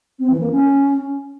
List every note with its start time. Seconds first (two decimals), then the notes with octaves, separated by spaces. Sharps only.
0.19 C4
0.29 E3
0.40 A#3
0.51 C#4